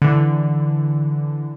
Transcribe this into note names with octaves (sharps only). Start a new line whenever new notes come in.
D3 E3